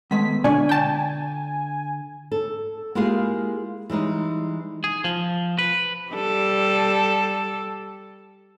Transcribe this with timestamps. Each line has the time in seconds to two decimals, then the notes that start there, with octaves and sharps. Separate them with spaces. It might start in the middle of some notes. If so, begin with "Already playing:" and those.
0.11 D#3 G#3 A3 B3 B6
0.44 B2 D3 D4 F4 D5 G#5 C#6
0.69 G5 A5
2.32 A4
2.95 G#3 A#3 E4 F4 G4 G#4
3.90 E3 G3 G#3 D#4
4.84 G#4
5.04 F3
5.59 B4
6.11 G3 A4